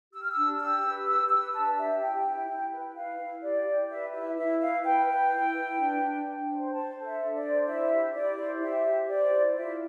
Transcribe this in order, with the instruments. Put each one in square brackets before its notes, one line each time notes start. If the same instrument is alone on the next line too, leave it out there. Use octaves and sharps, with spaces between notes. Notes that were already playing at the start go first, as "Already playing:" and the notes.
[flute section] G4 E6
F6
E6
D4
G4 E6
B4
G4 E6
B4 E6
D4 A5
G4 E5
E4 G5
E4
E4
B4
E4 F5
E4
G4 D5
G4
B4 E5
E4 E5
E4 E5
B4 F5
B4 G5
B4
E4
B4
D4
D4
D4
C5
C5 A5
A4
E5
D4
D5
C5
E4 E5
G4
E4 D5
C5
G4 E5
G4
C5 D5
E4
F4 E5